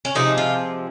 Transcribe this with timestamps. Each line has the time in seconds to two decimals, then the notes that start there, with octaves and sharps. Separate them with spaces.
0.05 C#4
0.15 C3 F3 G#3 C4 D#4
0.38 F4